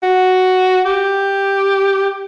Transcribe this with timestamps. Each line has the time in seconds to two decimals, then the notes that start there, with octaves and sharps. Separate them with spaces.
0.03 F#4
0.86 G4